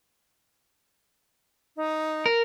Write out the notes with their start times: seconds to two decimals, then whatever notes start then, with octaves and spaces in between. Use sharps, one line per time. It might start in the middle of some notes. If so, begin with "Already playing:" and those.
1.77 D#4
2.26 A#4